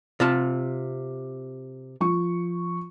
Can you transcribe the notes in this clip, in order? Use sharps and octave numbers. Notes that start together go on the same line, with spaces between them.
C3 F4 A5
F3 C#6